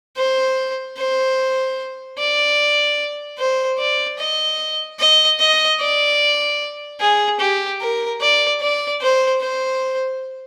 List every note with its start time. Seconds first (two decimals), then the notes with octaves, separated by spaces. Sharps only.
0.16 C5
0.97 C5
2.18 D5
3.38 C5
3.79 D5
4.19 D#5
4.99 D#5
5.39 D#5
5.80 D5
7.00 G#4
7.40 G4
7.80 A#4
8.20 D5
8.61 D5
9.01 C5
9.41 C5